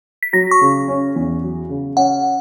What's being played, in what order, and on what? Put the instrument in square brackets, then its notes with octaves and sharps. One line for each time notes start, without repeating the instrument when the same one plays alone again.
[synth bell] B6
[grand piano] F#3 [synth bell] A#6
[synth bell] C#6
[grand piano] C#3
C#4
E2
F#3
C#3
[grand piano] C#4 [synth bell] F#5